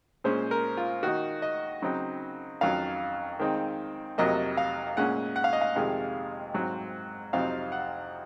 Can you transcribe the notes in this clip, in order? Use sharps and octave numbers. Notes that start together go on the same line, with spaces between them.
A#2 G#3 C#4 C5
A#4
F4
D#3 A#3 D#4 F#4
D#5
C#3 F#3 C4 D#4
F2 D#3 F#3 C#4 F5
D#3 G#3 C4 D#4
F2 C3 F#3 A#3 D#5
F5
A#2 G#3 C#4 F#5
F#5
F5
D#5
F5
F2 C3 D#3 G#3
G#2 F#3 C4
F2 C3 F#3 C4 D#4 F5
F#5